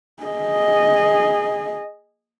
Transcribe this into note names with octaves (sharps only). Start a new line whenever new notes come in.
G#4 D#5